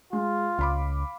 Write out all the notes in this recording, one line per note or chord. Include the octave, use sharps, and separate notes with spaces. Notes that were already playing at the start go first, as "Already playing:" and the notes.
G#3 F4
C#2 F5 B5 D6